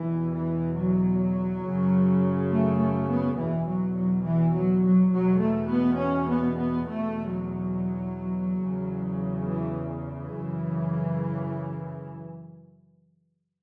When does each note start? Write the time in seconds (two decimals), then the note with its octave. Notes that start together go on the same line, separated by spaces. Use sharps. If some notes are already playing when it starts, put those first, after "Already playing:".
Already playing: E2 B2 E3
0.33 E3
0.77 F#3
1.64 F#2 C#3
2.50 A3
2.79 A3
3.08 B3
3.37 E2 B2 E3
3.67 F#3
3.96 F#3
4.24 E3
4.53 F#3
4.82 F#3
5.11 E2 B2 F#3
5.40 A3
5.69 B3
5.97 C#4
6.27 B3
6.56 B3
6.85 E2 B2 A3
7.29 F#3
8.58 E2 C#3
9.46 E3
10.04 E3
10.33 F#2 C#3